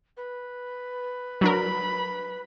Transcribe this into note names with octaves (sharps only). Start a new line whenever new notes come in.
B4
F#3 D4 A#4 B5